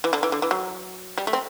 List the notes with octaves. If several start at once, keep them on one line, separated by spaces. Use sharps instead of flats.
E3
D3
E3
D3
E3
F#3
G3
A3
C4